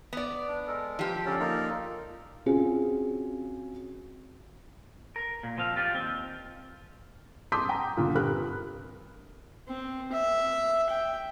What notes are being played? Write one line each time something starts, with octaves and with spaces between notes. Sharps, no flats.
B3 D5
D4
G#3 A4 A#4
F3 G4
D3 C#4 A4 A#4 D5
A#3 D#4 F4
C4 C#4 F4 F#4 G#4
A#4
A#2
F3 C4 F5
F4 G4 D5
D#2 C4
A5 C6 D6 D#6 G6 B6
G5 A#5
A#2 D3
G2 C3 A#4 B5 F6 F#6
C4
E5
G5